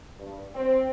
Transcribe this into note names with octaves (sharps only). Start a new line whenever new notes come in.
G2
C4